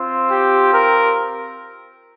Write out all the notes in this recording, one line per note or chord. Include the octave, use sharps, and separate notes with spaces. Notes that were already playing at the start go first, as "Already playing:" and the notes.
Already playing: C4 F4
G4
A#4